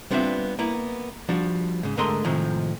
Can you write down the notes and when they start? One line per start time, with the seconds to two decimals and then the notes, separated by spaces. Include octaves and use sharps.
0.11 G3 B3 C4 D4 F4 E5
0.59 A#3 B3 E4
1.29 F3 G3 D4 F#4
1.83 G#2 C#3
1.97 G#2 D3 A3 A#4 D#5 C6
2.24 A2 C3 D#3 F3 G#3